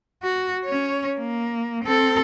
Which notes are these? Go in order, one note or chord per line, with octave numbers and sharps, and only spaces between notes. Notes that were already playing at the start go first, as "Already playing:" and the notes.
F#4
C#4 C#5
A#3
C4 A4